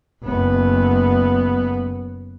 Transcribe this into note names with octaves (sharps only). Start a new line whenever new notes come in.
F#1 B3